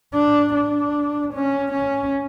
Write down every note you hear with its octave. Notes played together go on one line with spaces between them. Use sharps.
D4
D4
C#4
C#4